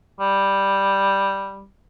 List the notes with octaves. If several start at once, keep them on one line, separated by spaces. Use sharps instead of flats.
G3